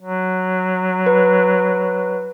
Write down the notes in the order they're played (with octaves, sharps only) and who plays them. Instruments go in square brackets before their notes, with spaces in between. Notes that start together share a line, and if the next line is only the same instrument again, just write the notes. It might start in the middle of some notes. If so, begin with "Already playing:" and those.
[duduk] F#3
[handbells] B4